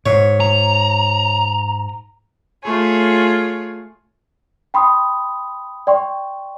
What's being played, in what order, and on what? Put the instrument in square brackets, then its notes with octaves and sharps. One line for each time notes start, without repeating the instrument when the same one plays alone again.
[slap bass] G#2 [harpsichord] C#5
[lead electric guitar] A#5
[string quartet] A3 F4 G#4 C#5
[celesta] G5 B5 C6 D#6
D5 G5 C6 C#6